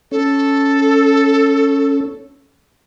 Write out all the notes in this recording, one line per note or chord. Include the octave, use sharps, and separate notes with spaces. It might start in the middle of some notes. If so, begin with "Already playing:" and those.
C#4 A4